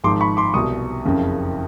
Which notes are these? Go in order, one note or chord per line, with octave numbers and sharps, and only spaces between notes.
G#1 G#2 F3 C6 D6
B5 C#6
C6 D6
C2 B2 G3 C#6 D#6
F#1 F2 C#3 F3